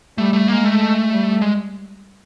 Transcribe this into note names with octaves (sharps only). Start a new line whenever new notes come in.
G3 A3
A3
G#3 A#3
A3
G3
G#3